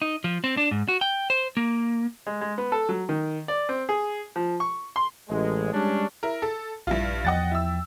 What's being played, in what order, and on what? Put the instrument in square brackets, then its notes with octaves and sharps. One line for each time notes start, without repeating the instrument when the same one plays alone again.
[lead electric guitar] D#4
F3
C4
D4
G#2
F#4
G5
C5
A#3
[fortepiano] G#3
G#3
B3
A4
F#3
D#3
D5
C4
G#4
F3
C#6
C6
[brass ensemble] A1 G#3
G3 G#3 C#4 D4
[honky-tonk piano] E4 A#4
A4
[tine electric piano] A#1 [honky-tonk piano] G2 E4 F4
[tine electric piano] E2 F3 G5 [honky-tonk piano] D#5 F#5 A6
[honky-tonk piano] E4 E6